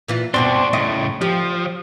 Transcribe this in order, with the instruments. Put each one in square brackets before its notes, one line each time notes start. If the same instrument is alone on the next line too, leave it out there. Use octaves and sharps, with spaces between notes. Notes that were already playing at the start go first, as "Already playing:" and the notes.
[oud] A#2 E3 F4
[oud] G2 B2 C4 [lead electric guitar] D4 F#4 [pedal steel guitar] D5 C6
[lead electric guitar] A2 C#3 [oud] D#5
[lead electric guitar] F3 [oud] G4